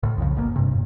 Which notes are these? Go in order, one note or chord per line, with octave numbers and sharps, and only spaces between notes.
D2 A2
C2 F2 C#3 F3
G#1 B2 D3 A#3
G2 C3
E1